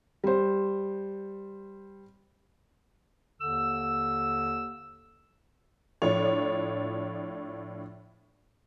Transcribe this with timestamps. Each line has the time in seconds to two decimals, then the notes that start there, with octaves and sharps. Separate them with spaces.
0.24 G3 C5
3.41 D#2 D3 E6
6.02 A2 F3 D4 C#5